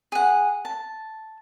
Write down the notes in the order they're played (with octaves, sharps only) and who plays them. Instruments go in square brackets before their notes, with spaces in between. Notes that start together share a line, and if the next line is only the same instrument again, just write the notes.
[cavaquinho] G#4 F#5
A5